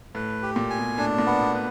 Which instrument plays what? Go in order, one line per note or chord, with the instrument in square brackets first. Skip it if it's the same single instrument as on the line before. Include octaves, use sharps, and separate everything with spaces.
[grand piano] A2 [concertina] B4
[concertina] G4
[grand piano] A#2
[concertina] G#5
[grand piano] B2
[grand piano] A2 [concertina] D4
[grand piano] A#2
[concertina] B3
[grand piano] B2
[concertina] B4